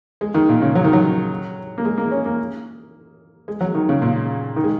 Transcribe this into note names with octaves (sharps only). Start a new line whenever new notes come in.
G#3
D#3
A#2
C#3
F#3
D#3
F#3
A#3
G#3
A#3
C#4
A#3
G#3
F#3
D#3
C#3
A#2
D#3
G#3